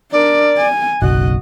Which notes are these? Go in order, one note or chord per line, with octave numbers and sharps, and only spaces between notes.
D4 A#4 D5
G#5
F#1 B1 F#4 D#5 F#6